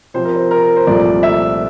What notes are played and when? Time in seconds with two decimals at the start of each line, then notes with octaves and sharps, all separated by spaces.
0.14 C3 F3 C4 C5
0.25 A#4
0.35 C5
0.51 A#4
0.76 C5
0.87 C2 A#2 F3 A3 D5
1.23 E5